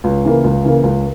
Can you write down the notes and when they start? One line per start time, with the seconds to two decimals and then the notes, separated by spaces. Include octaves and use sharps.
0.04 C#2
0.24 C#3 E3 A#3
0.44 C#2
0.64 C#3 E3 A#3
0.83 C#2